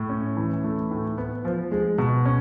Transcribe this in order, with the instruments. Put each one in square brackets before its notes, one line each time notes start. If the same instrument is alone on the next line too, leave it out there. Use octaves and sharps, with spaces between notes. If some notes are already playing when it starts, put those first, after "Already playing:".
Already playing: [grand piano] A2
C#4
E3
A3
A2
B3
F3
G#3
B2
C#4